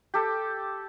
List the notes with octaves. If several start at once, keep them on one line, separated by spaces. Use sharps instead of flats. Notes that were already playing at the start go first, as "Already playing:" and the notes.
G4 A4